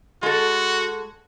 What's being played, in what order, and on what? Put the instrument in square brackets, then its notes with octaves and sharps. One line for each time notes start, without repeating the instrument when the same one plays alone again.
[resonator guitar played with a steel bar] G#3 A4 [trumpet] F#4